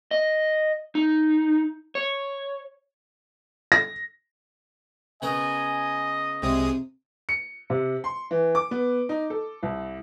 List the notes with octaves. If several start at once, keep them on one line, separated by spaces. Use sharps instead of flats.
D#5
D#4
C#5
A#6
C#3 B3 A#4 D#5 G#5
C2 C3 G#3 D#6
C#7
C3
C6
E3
D6
B3
D#4
A4
C2